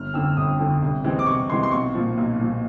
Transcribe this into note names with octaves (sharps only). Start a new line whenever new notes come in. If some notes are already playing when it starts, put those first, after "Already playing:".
Already playing: G1 F6
F2 D3 E6
G1 D#6
F2 D3
C2
C3 E3 G#3 C4
D6
C2 C#6
C3 E3 G#3 C4 C6
C6
B1 C#6
A#2 F3
B1
A#2 F3